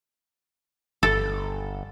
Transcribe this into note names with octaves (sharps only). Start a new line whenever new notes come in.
G1 A4